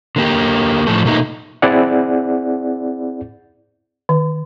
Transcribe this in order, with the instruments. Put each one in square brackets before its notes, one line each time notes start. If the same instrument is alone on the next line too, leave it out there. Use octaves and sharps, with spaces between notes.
[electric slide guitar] D3 A#3 G4
A2 F3 A3 A4
B2 A3 A#3 D#4
[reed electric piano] C4 E4 G#4 D5 F#5
[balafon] D#3